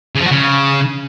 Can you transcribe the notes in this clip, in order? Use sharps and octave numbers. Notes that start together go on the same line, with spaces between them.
C#3
F3
F#4
C#3